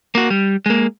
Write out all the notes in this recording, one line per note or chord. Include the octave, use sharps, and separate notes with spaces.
A#3 F#4
G3
G#3 A#3